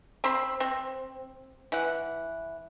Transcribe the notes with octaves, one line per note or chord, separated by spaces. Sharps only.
C4 C5 B5
C4
E3 F#5